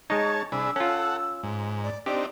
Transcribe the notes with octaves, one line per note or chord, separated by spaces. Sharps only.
G#3 D#4 C#5 A5 G#6
C2 D4 G#4 B5 E6
C#4 F4 A4 F#5
G#2
D5
C4 D4 D#4 G4 D5